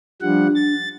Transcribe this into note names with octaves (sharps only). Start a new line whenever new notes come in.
F3 G3 D4 F#5
A6